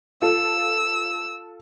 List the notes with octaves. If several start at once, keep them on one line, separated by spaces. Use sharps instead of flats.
F4 A4 E6